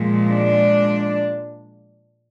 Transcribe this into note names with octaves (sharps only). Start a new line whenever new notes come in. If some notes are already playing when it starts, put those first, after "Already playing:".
Already playing: A#2 F3 G#3
D4